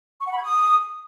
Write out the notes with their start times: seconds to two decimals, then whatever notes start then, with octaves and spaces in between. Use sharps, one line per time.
0.20 C#6
0.26 F#5
0.31 B5
0.37 G#6
0.43 D#6